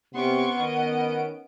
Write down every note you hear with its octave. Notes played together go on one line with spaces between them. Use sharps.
C3 B3 C#4 F#5 C6 C#6 D7
D#3 D#5